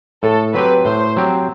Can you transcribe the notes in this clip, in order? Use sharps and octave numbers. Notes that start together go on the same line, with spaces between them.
A2 A4
F#3 C4 G4 B4
A2 C5
F#3 C4 G4